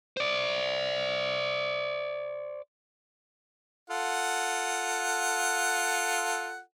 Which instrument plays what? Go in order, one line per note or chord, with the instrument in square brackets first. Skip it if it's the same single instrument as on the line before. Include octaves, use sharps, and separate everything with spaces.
[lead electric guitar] C5 D5
[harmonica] F4 A4 F#5